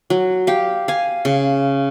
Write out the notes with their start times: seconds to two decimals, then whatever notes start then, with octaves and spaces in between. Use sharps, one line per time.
0.10 F#3
0.47 G4 F5
0.88 F5 G#5
1.25 C#3